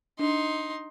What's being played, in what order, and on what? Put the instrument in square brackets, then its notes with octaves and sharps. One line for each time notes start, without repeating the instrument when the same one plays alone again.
[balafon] D4 [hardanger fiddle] D#4 C6